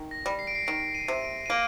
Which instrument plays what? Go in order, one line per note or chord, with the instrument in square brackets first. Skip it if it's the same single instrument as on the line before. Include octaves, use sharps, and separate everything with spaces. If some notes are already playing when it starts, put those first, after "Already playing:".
Already playing: [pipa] D#3
[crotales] A#6
[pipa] G3
[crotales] C7
D7
C7
[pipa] D#3 [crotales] D7
[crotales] D#7
[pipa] C3
[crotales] D7
D#7
[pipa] A#3 [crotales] D7